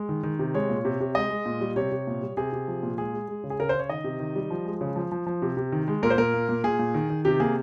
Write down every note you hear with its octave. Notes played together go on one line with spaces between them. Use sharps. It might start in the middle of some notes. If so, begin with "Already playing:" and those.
Already playing: G#3
D#3
D#3
C3
G#3 C#5
A#2
C3
C3
G#3 D#5
G#3
A#2
G3
C3 C#5
C3
A#2
G3
C3 G#4
C3
F3
A#2
G#3 G#4
G#3
G#3
C#3
G#4
C#3 A#4
C5
C#3 C#5
D#3 D#5
C3
D#3
G3
F3
G#3
C#3
F3
F3
F3
C3
C3
D#3
G#3
A#2 A#4
C5
A#2 A#4
A#3
A#2
A#2 G#4
A#2
D#3
D#3
C3 G4
A#3 G#4